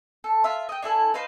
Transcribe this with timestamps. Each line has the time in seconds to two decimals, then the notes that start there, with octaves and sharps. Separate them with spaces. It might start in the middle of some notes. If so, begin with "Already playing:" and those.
0.24 A4
0.44 F4 E5
0.69 D#5 G5
0.82 D4 E4 A4 G#5
1.14 D#4 B4 C5 F5